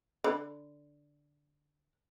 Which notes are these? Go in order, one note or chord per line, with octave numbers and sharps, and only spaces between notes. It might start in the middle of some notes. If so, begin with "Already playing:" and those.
D3 B5